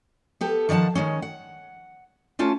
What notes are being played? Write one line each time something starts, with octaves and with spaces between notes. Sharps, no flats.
B3 G4 A4
D#3 F3 D5 F#5 A5
D#3 F3 G#3 C#4
F#5
A3 C#4 F4 A5